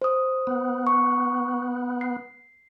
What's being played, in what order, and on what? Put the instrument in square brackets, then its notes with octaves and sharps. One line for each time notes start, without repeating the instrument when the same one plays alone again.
[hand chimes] C5 D#6
[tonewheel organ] B3
[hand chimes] C#6
C7